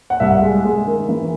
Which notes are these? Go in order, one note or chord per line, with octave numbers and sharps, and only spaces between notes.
F#5
C2 E5
G#3
G#3
D#3
E3